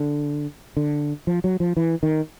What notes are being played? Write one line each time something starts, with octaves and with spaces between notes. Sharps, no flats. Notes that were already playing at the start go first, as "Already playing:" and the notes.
Already playing: D3
D3
F3
F#3
F3
E3
D#3